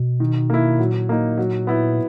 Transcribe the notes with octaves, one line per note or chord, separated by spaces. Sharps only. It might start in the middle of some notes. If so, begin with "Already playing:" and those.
Already playing: B2
D#3
A#3 E4
A#2 F#3
A#3 D#4
F#3
B3 E4